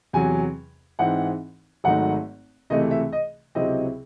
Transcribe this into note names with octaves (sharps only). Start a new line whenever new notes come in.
E2 C3 F#3 G#5
G#2 E3 C4 D#4 F#5
G#1 G#2 F#3 A3 D#4 F#5
C#2 C3 E3 A3 D#5
E5
D#5
C#2 C3 F#3 C4 E4 D#5